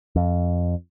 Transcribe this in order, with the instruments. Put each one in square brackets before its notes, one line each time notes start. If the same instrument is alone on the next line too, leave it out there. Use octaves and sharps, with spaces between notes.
[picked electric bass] F2